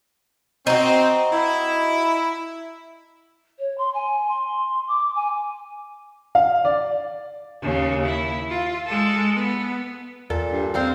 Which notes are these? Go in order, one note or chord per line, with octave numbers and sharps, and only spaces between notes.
C4 D#4 F#4
E4
C#5
C6
G#5
C6
D6
G#5
F5
D5
D#2 C#3
E4
F4
G#3 A4
B3
E2 A#2 A4 A5
G2
G3 C4 F5 C6